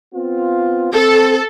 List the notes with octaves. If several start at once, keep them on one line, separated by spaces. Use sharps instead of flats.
B3 C4 F4
C4 A4